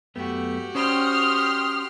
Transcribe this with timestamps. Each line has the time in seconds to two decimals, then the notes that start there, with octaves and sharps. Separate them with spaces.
0.16 F#2 A3 B3 F#4 G4
0.75 C#4 C5 D5 G5 C6 D#6 F6